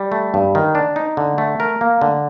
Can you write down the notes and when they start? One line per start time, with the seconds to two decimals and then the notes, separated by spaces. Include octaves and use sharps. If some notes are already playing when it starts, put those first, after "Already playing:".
Already playing: G3
0.12 A3
0.34 G2
0.55 D#3
0.75 D4
0.96 D#4
1.17 D3
1.38 A3
1.60 A#4
1.81 A#3
2.01 D3